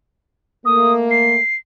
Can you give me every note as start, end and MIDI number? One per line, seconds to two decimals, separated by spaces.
0.65 1.38 57
0.65 1.38 58
0.65 0.93 87
1.11 1.56 96